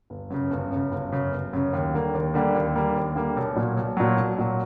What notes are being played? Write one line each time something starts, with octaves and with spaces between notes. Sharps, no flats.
G1
F#2 C#3
G1
F#2 C#3
G1
F#2 C#3
G1
F#2 C#3
D#2
D3 G3 A#3
D#2
D3 G3 A#3
D#2
D3 G3 A#3
D#2
D3 G3 A#3
B1
A#2 F#3
B1
A#2 F#3
B1
A#2 F#3